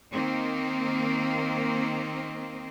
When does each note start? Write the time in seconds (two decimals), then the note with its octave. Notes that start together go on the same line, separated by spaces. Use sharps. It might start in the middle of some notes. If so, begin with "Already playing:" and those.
0.11 D#3 A#3 C4